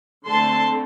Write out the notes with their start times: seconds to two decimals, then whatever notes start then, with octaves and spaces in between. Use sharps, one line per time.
0.27 D3 A3 C4 A5 C6